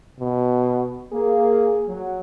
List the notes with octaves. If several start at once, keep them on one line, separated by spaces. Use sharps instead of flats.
B2
A#3 G#4
F#3